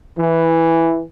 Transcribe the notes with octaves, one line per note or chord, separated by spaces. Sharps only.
E3